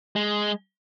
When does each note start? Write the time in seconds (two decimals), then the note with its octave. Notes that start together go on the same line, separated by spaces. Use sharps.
0.16 G#3